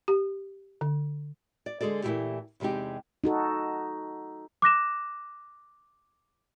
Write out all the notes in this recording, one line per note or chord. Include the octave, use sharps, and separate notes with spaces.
G4
D3
D5
D3 G#3 G#4 A4 D5
A#2 E3 F#3 A3 E4 G4
E2 C3 G#3 D#4 G4
D#4 F#4 A4
D6 F#6 A#6 E7